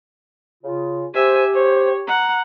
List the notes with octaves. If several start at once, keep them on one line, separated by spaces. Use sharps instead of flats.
C#3 F4
G4 C5 E5 G#5
C5 C#5
F#5 A#5